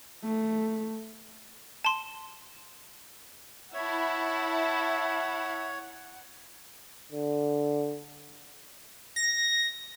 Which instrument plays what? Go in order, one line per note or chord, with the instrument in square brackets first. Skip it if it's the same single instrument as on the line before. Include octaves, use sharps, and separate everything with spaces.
[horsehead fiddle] A3
[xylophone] A5 C6
[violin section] E4 [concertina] C#5 [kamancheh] E5 A5 [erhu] F#5
[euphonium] D3
[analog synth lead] A#6